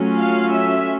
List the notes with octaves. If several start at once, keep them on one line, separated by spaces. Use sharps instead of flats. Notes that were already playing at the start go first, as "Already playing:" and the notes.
Already playing: F#3 A3 C#4 F4
F5
E5